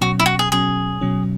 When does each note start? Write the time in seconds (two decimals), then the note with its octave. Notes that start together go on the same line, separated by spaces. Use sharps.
0.01 B2 F#3 C#4 F#4
0.19 E4
0.26 F#4
0.39 G#4
0.52 B2 F#3 C#4 G#4
1.01 B2 F#3 C#4